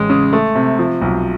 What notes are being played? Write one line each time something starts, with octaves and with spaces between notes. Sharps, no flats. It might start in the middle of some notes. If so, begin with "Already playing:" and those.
Already playing: A1 G#3
C#3
A3
C3
F3
B1